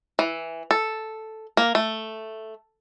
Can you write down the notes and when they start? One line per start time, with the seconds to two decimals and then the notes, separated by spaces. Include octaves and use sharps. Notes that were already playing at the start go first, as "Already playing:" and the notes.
0.19 E3
0.71 A4
1.57 A#3
1.75 A3